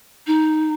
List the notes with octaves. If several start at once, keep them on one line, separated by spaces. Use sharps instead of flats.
D#4